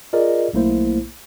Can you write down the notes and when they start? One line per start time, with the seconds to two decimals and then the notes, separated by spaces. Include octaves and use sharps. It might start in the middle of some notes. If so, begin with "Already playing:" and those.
0.13 F4 G#4 A#4 D5 D#5
0.53 B1 A3 A#3 E4 C5